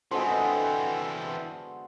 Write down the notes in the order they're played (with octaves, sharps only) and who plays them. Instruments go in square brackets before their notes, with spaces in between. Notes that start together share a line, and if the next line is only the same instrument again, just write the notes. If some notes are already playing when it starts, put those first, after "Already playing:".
[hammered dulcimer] D3 G#3 B3 [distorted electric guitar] E3 C4 [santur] F#4 A4 C5